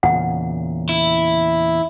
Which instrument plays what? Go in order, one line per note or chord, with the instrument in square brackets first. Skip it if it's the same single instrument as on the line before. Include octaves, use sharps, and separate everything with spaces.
[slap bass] E2 A#2 C#3 [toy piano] F#5
[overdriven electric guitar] E4